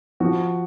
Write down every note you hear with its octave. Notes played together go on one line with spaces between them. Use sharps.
F3 F#4